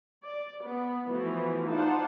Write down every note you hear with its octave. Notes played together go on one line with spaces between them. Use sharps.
D5
B3
E3 F3 A3 B3 E4 F#4
D#4 F4 C5 D5 F#5 A5